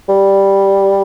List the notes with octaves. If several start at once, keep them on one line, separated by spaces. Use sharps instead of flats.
G3